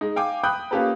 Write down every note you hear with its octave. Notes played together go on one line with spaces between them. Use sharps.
G#3 D#4
F5 G5 G#5 D6
G5 B5 D#6 F#6 G6
A#3 C#4 F4 G4 A4 B4